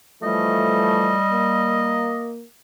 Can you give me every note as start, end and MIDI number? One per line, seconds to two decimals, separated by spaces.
0.23 1.20 52
0.23 1.20 53
0.23 2.21 55
0.23 1.20 57
0.23 2.30 75
1.31 2.43 58